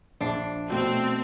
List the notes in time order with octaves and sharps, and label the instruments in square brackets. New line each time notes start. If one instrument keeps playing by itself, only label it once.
[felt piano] A#1 E5 C7 [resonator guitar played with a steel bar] D4
[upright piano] B2 A3 [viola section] C4